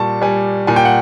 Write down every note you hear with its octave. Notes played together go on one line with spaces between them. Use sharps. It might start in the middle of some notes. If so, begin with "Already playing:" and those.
Already playing: A#2 G3 A5 C#6
G3 G#5
A#2 G#5
G5
F#5